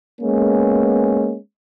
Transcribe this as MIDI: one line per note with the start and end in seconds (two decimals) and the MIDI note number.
0.21 1.38 56
0.21 1.38 58
0.21 1.38 59
0.21 1.38 61